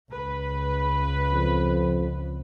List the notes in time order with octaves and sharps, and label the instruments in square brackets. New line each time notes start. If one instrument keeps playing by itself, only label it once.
[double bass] C#2 [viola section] B4
[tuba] F2